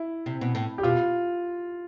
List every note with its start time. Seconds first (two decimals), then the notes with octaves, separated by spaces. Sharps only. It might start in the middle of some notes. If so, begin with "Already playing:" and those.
Already playing: E4
0.26 C3
0.41 B2
0.55 A2
0.78 G4
0.83 B2 F4